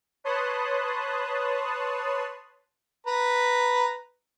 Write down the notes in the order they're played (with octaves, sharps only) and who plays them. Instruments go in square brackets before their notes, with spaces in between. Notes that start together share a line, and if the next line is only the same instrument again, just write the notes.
[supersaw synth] B4 C#5 A5 C6 D#6 F#6
[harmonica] B4 A#5